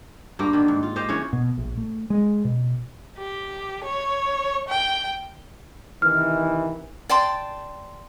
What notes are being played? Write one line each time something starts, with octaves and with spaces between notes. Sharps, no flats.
G2 A#3 C4 G4
D3 D#3
G#2
F4
G4 C5 D#5 F5
C#3 E3 C#5
B2
A#1
A3
G#3
B2
G4
C#5
G5
C3 D#3 E3 F6
D5 G5 A5 C6